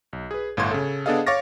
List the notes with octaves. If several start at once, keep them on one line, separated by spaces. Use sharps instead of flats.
B1
G#4 B4
G1 A2 F5 C6 G#6
C#3 A4
B3 D4 G#4 A4 D#5 F5
C#5 F5 C#6 D6 A6 A#6